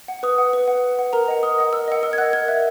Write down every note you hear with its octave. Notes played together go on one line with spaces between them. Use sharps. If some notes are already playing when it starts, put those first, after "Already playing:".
F#5
B4 D#6
F#5
B4
F#5
B4
F#5
A#4 A#5
D#5 F#5
A#4 D#6
D#5 F#5
A#4 E6
D#5 F#5
A#4 E6
G#6
D#5 F#5 F#6
A#4 G#6
E5